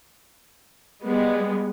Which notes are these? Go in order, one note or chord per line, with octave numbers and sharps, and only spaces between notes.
G3 G#3 B3